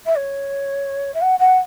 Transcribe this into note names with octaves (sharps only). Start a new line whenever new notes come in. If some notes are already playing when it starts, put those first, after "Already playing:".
E5
C#5
E5
F#5
F#5